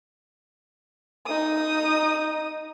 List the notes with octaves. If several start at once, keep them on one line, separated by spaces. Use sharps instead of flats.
D#4 D#6